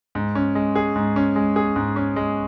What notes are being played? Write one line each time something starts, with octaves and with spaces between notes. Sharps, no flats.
G#2
C#4
G#3
G#4
G#2
C#4
G#3
G#4
G#2
C#4
G#3